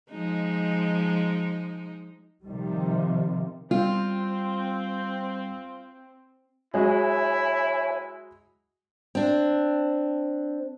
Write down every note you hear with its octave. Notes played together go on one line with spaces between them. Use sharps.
F3 G#3 D#4
C3 D#3 F3 G3
G3 C4 F4
F#3 G#3 E4 F#4 C#5 E5 G#5
C4 D4